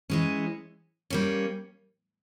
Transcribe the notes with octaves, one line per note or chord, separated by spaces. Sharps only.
E3 G#3 C#4
G3 A#3 C#4